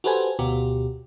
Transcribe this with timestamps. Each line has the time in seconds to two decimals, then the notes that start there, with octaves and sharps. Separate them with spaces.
0.04 F#4 G4 A4 B4 C5 G#5
0.39 D2 B2 F#4 G4